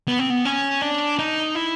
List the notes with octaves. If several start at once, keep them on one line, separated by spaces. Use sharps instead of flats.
B3
C4
B3
C#4
D4
D#4
E4